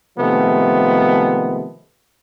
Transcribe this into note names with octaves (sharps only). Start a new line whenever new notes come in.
C3 D#3 F3 G#3 A3 B3